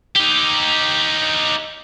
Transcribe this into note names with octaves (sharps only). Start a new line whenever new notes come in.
D#4 G4